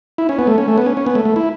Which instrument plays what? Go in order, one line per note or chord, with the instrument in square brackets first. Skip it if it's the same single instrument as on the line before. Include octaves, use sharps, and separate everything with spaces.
[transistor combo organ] E4
C#4
B3
A3
C#4
A3
B3
C#4
C#4
B3
A3
A3
E4